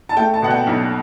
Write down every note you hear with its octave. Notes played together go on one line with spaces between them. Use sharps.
A5
A3 G5
A5
B2 F#5
G5
B1